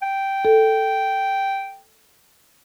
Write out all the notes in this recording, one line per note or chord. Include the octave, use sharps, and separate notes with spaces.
G5
A4